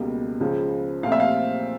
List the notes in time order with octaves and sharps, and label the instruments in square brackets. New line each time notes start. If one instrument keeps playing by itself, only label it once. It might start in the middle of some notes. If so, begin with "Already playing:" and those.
Already playing: [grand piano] C#2 B2 G3 A#3
C#2 C#3 F3 G#3
A#2 F3 A3 C4 F5
E5
F5